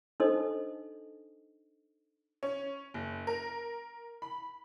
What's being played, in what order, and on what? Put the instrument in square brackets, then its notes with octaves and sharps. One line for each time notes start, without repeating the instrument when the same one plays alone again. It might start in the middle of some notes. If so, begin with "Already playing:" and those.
[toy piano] D4 D#4 A4 C5 D#5
[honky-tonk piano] C#4
F#1
A#4
B5